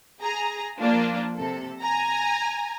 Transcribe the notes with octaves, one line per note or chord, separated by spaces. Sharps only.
G#4 A#5
F3 A#3 D4 F4
C3 A4
G#5 A#5